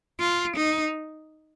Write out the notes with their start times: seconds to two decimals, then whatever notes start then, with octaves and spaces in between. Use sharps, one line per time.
0.20 F4
0.56 D#4